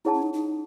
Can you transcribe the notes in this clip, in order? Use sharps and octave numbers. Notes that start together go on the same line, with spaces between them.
D#4 E4 G#4 C#5 F#5 A5
C#4
D#4
D#4